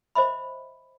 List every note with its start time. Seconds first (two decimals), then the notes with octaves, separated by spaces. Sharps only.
0.15 C5 D#5 E5 B5